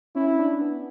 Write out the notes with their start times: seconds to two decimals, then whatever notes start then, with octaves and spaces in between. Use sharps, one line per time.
0.15 C#4 E4
0.39 D4
0.61 B3